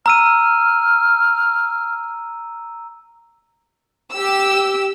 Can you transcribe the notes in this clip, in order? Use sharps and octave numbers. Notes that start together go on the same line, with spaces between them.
A#5 E6 F6 D#7
G4 E6